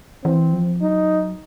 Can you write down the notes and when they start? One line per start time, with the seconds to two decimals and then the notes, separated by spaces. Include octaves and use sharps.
0.24 E3 C4
0.53 F3
0.81 F#3 D#4